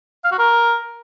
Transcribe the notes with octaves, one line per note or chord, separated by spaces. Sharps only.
F5
F#4
A#4